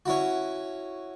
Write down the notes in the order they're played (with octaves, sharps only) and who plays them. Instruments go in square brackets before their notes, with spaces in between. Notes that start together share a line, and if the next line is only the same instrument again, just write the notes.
[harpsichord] C#4 E4 F#4